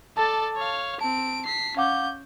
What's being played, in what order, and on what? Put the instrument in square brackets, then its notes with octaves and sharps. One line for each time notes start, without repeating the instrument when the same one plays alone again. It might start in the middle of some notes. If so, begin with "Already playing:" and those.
[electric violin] A4 D5 [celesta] A5 A6
[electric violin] C#5 F5
[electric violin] C4 D7 [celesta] A5
[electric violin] B6 C7
[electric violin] C#4 G6 [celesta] F5 F#5 D6